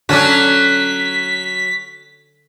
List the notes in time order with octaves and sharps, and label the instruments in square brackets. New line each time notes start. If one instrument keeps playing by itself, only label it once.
[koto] D3 D4 [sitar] F#3 C#4 F#4 [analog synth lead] B6